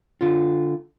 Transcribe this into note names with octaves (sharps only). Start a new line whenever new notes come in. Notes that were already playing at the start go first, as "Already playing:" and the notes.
D3 F4